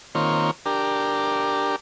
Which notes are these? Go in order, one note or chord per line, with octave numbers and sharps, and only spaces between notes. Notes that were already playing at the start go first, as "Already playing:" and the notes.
D#3 A#3 C4 F4 C#5
D4 G4 A#4